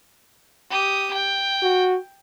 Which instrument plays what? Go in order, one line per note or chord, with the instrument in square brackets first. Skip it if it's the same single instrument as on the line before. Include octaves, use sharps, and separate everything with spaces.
[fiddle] G4 D#6
G5
[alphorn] F#4